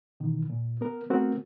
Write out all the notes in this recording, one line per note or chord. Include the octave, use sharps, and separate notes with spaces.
B2 D#3 E3
A#2
B3 A#4
A3 B3 C4 F#4 A#4